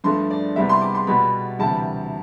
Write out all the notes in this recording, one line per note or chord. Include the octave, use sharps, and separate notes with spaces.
G2 F3 A3 C6
D5
C2 C3 G3 B3 E5
C6
D6
C6
B2 G3 B3 B5
D2 C3 E3 G3 A5